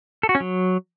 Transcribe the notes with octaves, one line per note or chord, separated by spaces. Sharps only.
A4
F#4
C#4
F#3